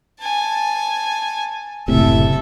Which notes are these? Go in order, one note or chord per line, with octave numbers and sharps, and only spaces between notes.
G#5 A5
F#1 A2 C3 A4 E5